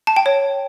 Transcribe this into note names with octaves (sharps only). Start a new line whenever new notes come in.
A5
G5
C#5